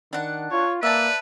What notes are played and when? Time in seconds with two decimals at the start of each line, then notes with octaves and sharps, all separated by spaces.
0.13 D#3 D4 F#5
0.51 F4 C#5
0.83 A#3 B4 D5 E5 A5